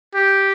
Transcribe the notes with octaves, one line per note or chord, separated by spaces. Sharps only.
G4